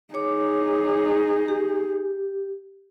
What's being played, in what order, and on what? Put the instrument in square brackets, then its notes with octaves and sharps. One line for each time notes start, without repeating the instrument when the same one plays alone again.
[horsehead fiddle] D#4 G#4 [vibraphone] C#5 D6
[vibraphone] G4